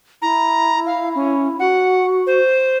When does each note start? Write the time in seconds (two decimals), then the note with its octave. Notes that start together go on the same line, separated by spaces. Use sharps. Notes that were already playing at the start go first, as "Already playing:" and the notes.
0.22 E4 A#5
0.86 F5
1.15 C#4
1.59 F#4 F#5
2.27 C5